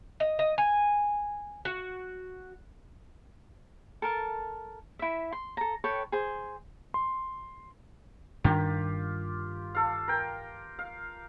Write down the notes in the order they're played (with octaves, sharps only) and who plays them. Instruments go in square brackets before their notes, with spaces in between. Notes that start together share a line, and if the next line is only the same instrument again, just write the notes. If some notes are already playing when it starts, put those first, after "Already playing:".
[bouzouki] D#5
D#5
G#5
F#4
[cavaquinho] A4 A#4 A5
E4 E5
C6
A4 A#5
A4 B4 C#5 G5
G#4 C5
[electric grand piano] C6
[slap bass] G2 D4 [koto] D#3 [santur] F4 G4
[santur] A4 F5
A#4 G5
F5